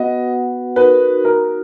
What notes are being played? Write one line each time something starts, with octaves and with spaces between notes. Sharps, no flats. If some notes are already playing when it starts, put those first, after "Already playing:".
Already playing: B3 F#4 B4 D#5 F#5
D#4 F#4 A#4 B4
A#4